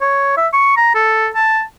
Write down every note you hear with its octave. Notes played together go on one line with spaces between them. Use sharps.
C#5
E5
C#6
A#5
A4
A5